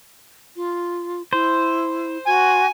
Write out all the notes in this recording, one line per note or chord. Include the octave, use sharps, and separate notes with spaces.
F4
E4 C5
F#4 G#5